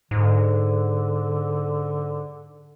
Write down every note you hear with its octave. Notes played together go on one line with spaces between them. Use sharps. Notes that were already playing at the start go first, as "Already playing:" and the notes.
G#2 D3